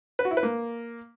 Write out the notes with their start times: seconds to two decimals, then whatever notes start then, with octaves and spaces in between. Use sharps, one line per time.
0.19 B4
0.25 F#4
0.31 E4
0.37 B4
0.43 A#3